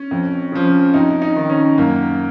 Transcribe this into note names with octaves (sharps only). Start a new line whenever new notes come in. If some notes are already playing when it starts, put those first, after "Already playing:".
Already playing: C#4
F2
C#3 F3
F2 D#4
D#4
D#3
C#4
F#2 A#3